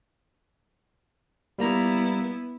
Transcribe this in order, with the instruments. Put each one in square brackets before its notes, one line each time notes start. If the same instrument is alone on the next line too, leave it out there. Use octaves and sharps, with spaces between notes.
[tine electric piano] G3 A#3 A#5 [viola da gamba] B3 E4